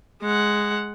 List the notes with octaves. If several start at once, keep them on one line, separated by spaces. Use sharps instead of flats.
G#3 F#5